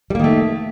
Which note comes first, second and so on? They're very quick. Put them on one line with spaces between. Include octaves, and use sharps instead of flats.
G3 A#3 D#3 A3